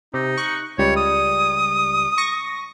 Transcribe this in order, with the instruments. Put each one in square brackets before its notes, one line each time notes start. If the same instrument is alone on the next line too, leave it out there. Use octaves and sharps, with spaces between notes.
[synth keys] C3 [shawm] D#4
[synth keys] C#6 F#6
[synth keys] C#2 G3 [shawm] C#5
[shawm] D#6
[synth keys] C#6 A#6